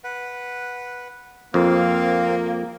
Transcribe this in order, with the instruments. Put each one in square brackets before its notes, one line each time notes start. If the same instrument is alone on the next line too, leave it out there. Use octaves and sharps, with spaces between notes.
[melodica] B4 F#5
[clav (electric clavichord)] F2 [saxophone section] A#3 [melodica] C4 F5